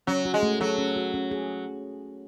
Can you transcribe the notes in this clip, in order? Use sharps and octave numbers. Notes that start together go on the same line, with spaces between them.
F#3 C#4
F#4
G#3
A3
F#3 A4
C#4
F#4
C#4
G#4